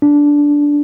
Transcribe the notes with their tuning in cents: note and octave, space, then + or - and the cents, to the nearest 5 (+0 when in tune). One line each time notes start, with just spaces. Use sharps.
D4 -10